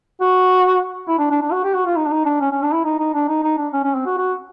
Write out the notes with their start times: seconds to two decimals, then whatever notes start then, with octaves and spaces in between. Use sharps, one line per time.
0.21 F#4
1.09 E4
1.19 D4
1.31 D4
1.42 D4
1.52 F#4
1.64 G4
1.74 F#4
1.86 F4
1.97 D#4
2.06 D4
2.11 D#4
2.26 D4
2.41 C#4
2.52 C#4
2.63 D4
2.73 E4
2.85 D#4
2.99 D#4
3.14 D4
3.29 D#4
3.43 D#4
3.58 D4
3.73 C#4
3.84 C#4
3.95 C4
4.06 F#4
4.18 F#4